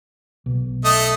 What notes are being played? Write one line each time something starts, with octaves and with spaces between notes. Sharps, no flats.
B1
A3 D#5 D#6